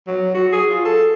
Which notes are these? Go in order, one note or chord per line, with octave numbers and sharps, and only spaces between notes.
F#3
F#4
G#4
F4
A4